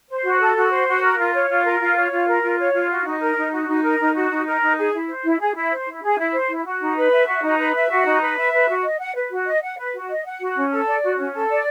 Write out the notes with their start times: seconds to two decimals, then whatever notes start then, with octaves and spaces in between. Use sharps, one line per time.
0.09 C5
0.24 F#4
0.40 A4
0.56 F#4
0.71 C5
0.87 F#4
1.03 A#4
1.18 F4
1.34 C#5
1.49 F4
1.65 A#4
1.80 F4
1.96 C#5
2.11 F4
2.27 A#4
2.42 F4
2.59 C#5
2.74 F4
2.90 F#4
3.05 D#4
3.21 A#4
3.37 D#4
3.52 F#4
3.68 D#4
3.83 A#4
4.00 D#4
4.15 F#4
4.30 D#4
4.46 A#4
4.62 D#4
4.77 G#4
4.93 E4
5.09 C5
5.24 E4
5.39 G#4
5.55 E4
5.71 C5
5.87 E4
6.02 G#4
6.18 E4
6.33 C5
6.50 E4
6.65 F#4
6.81 D#4
6.96 B4
7.11 E5
7.27 F#4
7.42 D#4
7.58 B4
7.74 E5
7.90 F#4
8.05 D#4
8.21 B4
8.37 E5
8.52 B4
8.68 F#4
8.84 D#5
8.99 F#5
9.15 B4
9.31 F#4
9.46 D#5
9.62 F#5
9.78 B4
9.93 F#4
10.08 D#5
10.24 F#5
10.40 F#4
10.55 C#4
10.71 A4
10.87 D5
11.03 F#4
11.17 C#4
11.34 A4
11.49 D5